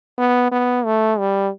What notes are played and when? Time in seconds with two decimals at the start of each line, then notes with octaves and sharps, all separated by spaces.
0.18 B3
0.52 B3
0.85 A3
1.19 G3